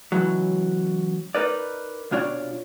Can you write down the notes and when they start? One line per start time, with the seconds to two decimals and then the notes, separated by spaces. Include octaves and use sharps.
0.12 C#2 E3 F#3
1.35 D#4 A#4 B4 D5
2.11 C2 B2 D4 F4 C#5 D5